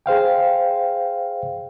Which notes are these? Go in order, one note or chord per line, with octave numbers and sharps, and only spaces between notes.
G#4 C5 F5 G5